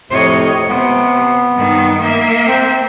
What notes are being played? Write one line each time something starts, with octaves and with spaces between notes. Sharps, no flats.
F2 A2 C3 C#5 D#5
C3 B3
G2 D#3
A#3 E5
C4